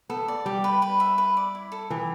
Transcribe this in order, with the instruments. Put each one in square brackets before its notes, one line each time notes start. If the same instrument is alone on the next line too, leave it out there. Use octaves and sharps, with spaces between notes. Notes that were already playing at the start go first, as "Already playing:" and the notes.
[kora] B3 [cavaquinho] A4
[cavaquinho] D5
[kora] G3 [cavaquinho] G4
[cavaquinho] B4
B4
E5
B4
D5
E4
A4
[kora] E3 [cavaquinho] G4